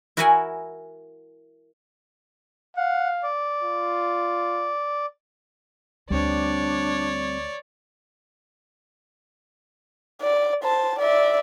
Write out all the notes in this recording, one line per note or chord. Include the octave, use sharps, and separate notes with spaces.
E4 F#4 A#4 E5 F#5 G#5
F5 F#5
D5
F4
D2 G3 C4 D4 C#5 D5
D5
C5 A5
D5 E5